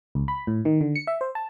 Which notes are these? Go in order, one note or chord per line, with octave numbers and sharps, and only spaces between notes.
C#2
B5
A2
D#3
D3
C#7
E5
C5
A5